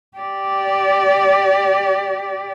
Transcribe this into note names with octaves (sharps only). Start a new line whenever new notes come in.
G4 D5